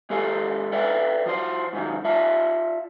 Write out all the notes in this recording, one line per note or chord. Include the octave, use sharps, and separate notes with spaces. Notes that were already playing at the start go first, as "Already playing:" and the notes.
G#3 G4 A4 D5 F5
A4 B4 D5 E5 F5 G5
F3 F#4 C5
G#2 D#3 E3 F#3
F4 D5 E5 F5 A5